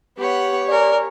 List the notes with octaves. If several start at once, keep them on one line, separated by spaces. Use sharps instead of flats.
B3 G4 C#5 F#5
A#4 D5 G#5